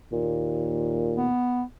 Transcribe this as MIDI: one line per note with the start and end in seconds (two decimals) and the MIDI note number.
0.12 1.31 39
0.12 1.30 46
1.17 1.63 59